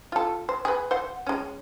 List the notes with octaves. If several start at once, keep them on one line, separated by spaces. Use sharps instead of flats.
F4 A4
C5
G#4 B4
C5 F#5
G#3 C#4